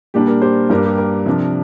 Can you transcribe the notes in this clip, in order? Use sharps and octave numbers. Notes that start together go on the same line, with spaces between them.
A#2 G3 A#3 D4 G4
A#4
G4 C5
G2 G3 A#3 D4 A#4
G4
A#4
C3 F3 D4